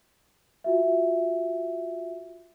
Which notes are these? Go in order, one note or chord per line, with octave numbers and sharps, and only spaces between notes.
F4 F#4 E5